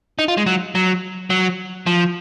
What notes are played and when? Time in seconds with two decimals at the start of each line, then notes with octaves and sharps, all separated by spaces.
0.19 D#4
0.28 F4
0.37 G#3
0.46 F#3
0.75 F#3
1.30 F#3
1.87 F3